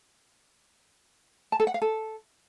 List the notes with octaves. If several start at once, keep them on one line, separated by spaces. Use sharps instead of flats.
A5
A4
F#5
F5
A4